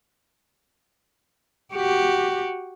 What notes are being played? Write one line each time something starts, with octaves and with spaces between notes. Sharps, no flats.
F#4 G4